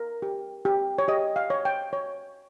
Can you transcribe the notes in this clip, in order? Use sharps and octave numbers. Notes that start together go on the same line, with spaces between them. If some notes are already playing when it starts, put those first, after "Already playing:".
Already playing: A#4
G4
G4
C#5
G4 D#5
F5
C#5
G5
C#5